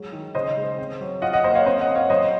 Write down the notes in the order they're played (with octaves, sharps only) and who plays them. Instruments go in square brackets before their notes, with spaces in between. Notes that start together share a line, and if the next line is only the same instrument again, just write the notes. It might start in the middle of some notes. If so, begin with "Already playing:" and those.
Already playing: [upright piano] F#3 G#3
D#3
C#3 C5 D#5
G#3
C4
F#3
F4 D#5 F#5
D#5 F#5
A#3 C5 D#5
C#5 F5
C4 C5 D#5
D#5 F#5
C4
C#5 F5
F#3 C5 D#5